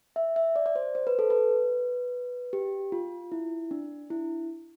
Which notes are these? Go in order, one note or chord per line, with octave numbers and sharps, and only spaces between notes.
E5
E5
D5
D5
C5
C5
B4
A4
B4
G4
F4
E4
D4
E4